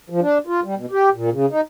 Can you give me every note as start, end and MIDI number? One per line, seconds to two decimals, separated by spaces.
0.10 0.20 53
0.21 0.38 62
0.47 0.60 65
0.64 0.75 55
0.76 0.86 47
0.91 1.09 67
1.14 1.30 46
1.32 1.46 49
1.51 1.61 63